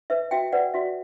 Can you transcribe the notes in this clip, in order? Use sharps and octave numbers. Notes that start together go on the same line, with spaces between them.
B4 E5
F#4 E5 G5
B4 D5 F#5
F#4 E5